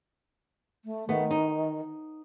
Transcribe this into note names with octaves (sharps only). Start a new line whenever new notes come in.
A3
D#3 A3 B3
D#4